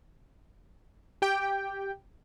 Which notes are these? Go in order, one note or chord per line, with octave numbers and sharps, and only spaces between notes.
G4 G5